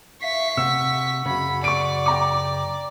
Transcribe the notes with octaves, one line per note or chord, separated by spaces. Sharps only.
E5 F5 C#6 B6
C3 F#5 E6
F#2 C#3 B5
D5 C#6 D7
G5 A#5 D6